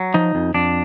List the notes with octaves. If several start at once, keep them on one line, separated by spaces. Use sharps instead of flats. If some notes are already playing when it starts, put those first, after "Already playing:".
Already playing: F#3
F3 D#4
F2
F2 D4